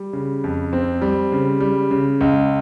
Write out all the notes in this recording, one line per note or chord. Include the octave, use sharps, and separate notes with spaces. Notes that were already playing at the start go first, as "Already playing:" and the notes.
Already playing: G3
C#3
F2
C4
G3
C#3
G3
C#3
C#2